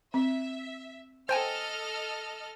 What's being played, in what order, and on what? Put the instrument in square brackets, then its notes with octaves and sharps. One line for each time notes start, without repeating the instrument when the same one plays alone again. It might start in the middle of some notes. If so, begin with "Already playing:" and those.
[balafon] C4 [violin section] E5
[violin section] A4 D#5 F6 [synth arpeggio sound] C5 G5 G#5